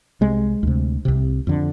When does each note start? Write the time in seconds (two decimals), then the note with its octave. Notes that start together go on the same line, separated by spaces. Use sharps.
0.21 C2 C3 G#3
0.63 D2 C3
1.05 C2 C3
1.47 F2 D3